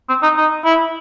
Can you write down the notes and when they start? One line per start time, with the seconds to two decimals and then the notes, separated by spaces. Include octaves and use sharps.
0.09 C4
0.22 D#4
0.37 D#4
0.65 E4